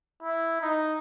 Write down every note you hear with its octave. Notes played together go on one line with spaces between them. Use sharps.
E4
D#4